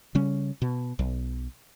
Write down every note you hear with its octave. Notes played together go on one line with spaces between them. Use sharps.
C#3 G3 C#4
B2
B1